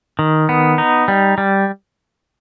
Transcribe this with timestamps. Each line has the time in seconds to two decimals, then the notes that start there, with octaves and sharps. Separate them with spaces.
0.19 D#3
0.49 B3
0.78 D#4
1.08 G3
1.38 G3